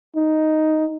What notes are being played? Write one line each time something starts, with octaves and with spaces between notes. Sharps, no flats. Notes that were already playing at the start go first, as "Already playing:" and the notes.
D#4